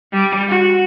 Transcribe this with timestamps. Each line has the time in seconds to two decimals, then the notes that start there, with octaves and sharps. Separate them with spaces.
0.13 G3
0.48 F#4